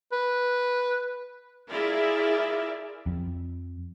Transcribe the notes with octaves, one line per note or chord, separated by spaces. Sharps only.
B4
E4 F4 G#4 A#4 D5 E5
F2